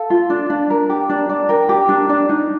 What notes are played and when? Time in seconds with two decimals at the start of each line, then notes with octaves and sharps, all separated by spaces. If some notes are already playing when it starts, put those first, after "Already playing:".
Already playing: A4 F5
0.10 F4
0.30 D4
0.50 D4
0.70 A#4
0.90 G4
1.10 D4
1.29 D4
1.49 A#4 G5
1.69 G4
1.89 D4
2.09 D4
2.29 D#4